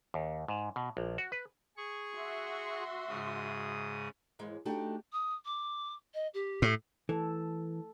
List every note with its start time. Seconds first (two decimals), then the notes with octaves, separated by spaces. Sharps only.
0.14 D#2
0.48 G#2
0.76 B2
0.97 A#1
1.18 F#4
1.32 B4
1.77 G#4 C#6
2.16 F#4 E5 C6
3.09 G#2 C#3 D#6
4.39 D#2 G#2 E3 G#3
4.65 A3 D4 D#4 F#4 G4
5.12 D#6
5.45 D6
6.14 D#5
6.34 G4
6.62 A2
7.09 E3 A4